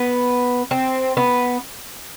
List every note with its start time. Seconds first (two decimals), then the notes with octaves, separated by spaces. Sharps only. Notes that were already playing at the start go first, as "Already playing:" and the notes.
Already playing: B3
0.71 C4
1.17 B3